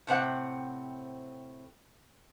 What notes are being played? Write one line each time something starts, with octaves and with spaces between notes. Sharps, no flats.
A2 C3 C4 F#5